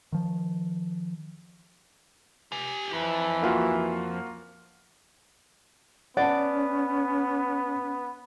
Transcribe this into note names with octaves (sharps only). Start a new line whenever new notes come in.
D#3 F3
G4 G#5
F2 E3
A#3 F4 F#4
B3 C#4 D5 F#5 A5